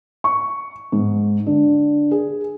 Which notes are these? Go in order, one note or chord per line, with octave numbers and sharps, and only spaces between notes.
C#6
G#2
D3
G#4